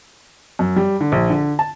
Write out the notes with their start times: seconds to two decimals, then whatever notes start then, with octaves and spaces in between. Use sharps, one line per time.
0.59 F#2
0.76 G3
1.01 D3
1.12 A#1
1.30 D3
1.59 A5